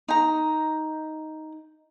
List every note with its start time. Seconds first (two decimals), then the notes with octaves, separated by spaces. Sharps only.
0.08 D#4 A#5